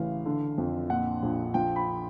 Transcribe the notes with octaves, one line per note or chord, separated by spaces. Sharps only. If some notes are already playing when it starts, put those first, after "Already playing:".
Already playing: A1 C#3 E3 F5
D3
F2
A#2 F#5
A#1
F3 G5
B5